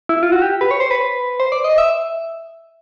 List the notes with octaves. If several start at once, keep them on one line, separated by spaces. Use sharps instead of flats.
E4
F4
F#4
G4
B4
C#5
C5
B4
C5
D5
D#5
E5